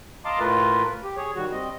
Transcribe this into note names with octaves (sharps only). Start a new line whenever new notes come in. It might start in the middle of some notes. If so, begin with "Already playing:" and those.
D#5 F5 A5 A#5 C6 D6
A2 A3 F4 A#4 B4
G4
G#4 C#5
D#3 G3 F#4
G3 C4 D#5